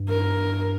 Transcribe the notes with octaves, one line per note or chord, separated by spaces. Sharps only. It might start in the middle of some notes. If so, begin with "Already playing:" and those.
Already playing: G2
A#4